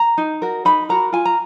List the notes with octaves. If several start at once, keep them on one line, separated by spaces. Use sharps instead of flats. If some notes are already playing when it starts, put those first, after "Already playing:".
Already playing: A#5
D#4
F#4 A#4
D#4 B5
F#4 A#4 A#5
F4 G#5
A#5